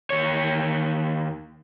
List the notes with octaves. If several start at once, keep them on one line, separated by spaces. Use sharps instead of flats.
D#2 C#5